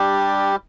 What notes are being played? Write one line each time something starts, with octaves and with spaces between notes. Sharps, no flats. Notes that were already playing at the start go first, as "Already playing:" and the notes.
Already playing: G3 D4 G4